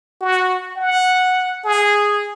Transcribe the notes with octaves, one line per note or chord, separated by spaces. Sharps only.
F#4
F#5
G#4